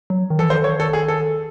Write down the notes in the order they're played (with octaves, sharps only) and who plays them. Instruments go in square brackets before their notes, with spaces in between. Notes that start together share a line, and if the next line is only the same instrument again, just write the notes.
[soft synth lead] F#3
D#3
[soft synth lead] E3 [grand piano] A4
[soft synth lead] D#3 [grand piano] C5
[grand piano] C#5
A4
G#4
A4